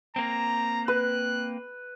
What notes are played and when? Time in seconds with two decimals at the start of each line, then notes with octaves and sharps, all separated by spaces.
0.16 A#3 C4 A#5
0.88 B4 F#6